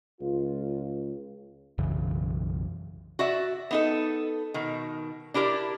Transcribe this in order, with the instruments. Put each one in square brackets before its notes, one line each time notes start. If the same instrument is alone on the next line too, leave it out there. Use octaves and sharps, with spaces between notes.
[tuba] C#2 [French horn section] F4
[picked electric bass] B1 F#2 C#3 E3
[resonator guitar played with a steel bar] F#4 D5 E5
B3 D#4 A4
B2 D#3
D4 E4 G4 A#4 D5